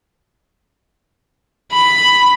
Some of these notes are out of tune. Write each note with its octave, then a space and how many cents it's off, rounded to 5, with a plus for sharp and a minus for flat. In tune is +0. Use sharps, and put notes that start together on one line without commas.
B5 +5